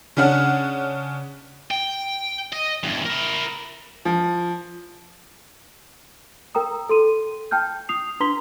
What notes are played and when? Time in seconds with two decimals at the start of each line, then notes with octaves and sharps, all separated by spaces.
0.17 C#3 C#4 D4 F#5 F6
1.71 G5
2.52 D#5
2.83 E2 G2
3.05 E4 A#4
4.05 F3
6.55 A#4 G5 A#5 D#6
6.89 A4 C6 D#7
7.51 G5 A5 F6 G6
7.89 D#6 C7 F7
8.20 D4 B4 A#5 C6 B6 G7